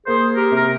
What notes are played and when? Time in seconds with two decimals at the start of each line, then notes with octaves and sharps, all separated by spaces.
0.07 A#3 G#4 C5
0.36 G4 A#4
0.51 C3
0.57 A#4